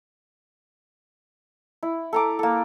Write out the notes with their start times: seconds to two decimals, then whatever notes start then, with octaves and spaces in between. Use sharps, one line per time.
1.83 E4
2.13 A4 A#5 D6
2.39 A#3 A4